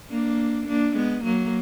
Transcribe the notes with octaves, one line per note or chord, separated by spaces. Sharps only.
A#3 D4
A#3 D4
G#3 B3
F#3 A#3